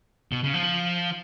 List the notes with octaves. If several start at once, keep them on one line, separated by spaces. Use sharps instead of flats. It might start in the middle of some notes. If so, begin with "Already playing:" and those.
B2
C#3
F3